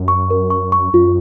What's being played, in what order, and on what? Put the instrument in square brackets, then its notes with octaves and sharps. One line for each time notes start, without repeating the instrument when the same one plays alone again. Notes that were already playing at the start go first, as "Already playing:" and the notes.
Already playing: [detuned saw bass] F#2
[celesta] C#6
A#4
C#6
C#6
[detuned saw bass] F#2 [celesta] F4